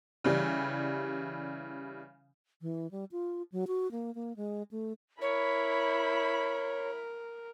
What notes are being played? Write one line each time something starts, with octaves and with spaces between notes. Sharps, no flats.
C#3 E3 G3
E3
G3
F4
F#3
F#4
A#3
A#3
G#3
A3
E4 A#4 C#5 B5